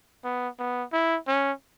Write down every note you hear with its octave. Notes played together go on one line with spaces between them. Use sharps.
B3
B3
E4
C#4